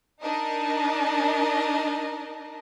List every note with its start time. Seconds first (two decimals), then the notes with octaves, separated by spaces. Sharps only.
0.22 D4 D#4 A#4 D#5